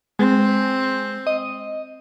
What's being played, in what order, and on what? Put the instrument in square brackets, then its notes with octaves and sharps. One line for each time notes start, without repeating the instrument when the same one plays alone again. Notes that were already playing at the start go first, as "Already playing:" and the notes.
[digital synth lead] G#3 [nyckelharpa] C4
[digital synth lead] D#5